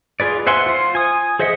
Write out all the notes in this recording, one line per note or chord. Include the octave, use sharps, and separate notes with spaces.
F4 G#4 B4 D5
C5 E5 F#5 G#5 C6
F4 C5
G#5 D#6
G#4 C5 D#5 E5 F#5